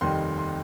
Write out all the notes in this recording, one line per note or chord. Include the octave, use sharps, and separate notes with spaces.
F1 D#2 D#3 G3 C6
C6